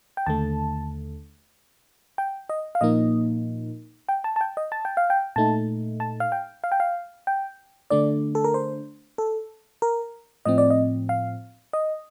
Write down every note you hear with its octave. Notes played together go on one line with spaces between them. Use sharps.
G5
D#2 D3 A3 A5
G5
D#5
F5
A#2 F3 A#3 D#4 D#5
G5
A5
A5
G5
D#5
A5
G5
F5
G5
A#2 A3 D#4 A5
A5
F5
G5
F5
G5
F5
G5
D3 A3 D4 D5
A4
A#4
C5
A4
A#4
A2 F3 C4 D#5
D5
D#5
F5
D#5